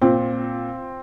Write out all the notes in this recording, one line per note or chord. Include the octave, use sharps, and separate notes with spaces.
A#2 C4